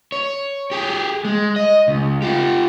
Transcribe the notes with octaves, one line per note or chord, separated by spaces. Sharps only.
C#5
G4 G#4
G#3
D#5
C#2
F4 G4